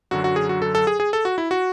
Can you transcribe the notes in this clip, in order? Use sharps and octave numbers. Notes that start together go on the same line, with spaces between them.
F#2 D3 F#3 F#4
F#4
G#4
F#4
A4
A4
G#4
G#4
A4
F#4
E4
F#4